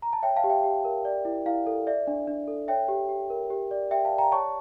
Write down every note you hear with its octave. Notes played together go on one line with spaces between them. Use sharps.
A#5
A5
C#5 E5 G5
F5 A5
G4
E5 G5
G4
A#4
D5
E4
E4 F5
A4
D5 E5
D4
D4
A4
C#5 E5 G5
G4
G4
A#4
G4
D5
G4 E5 G5
F5 A5
D5
G5 A#5
C#5 A5 C#6